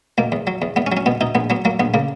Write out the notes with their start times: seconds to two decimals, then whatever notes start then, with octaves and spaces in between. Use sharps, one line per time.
0.18 B2 A#3
0.32 E2
0.47 F#3
0.62 E2
0.76 E2 B3
0.87 C#4
0.92 F#3
0.97 C#4
1.06 B2 B3
1.21 B2 D#4
1.35 A#1 B3
1.50 F#3 B3
1.65 F#3 A#3
1.80 A#1 B3
1.94 C#3 A#3